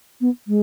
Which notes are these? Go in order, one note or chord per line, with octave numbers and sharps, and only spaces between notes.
B3
G#3